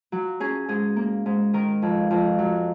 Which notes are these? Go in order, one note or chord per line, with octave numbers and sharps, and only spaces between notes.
F#3
C#4 G#4
G#2 G#4
A#3
G#2
D#3 A#4
F2
F2
F#3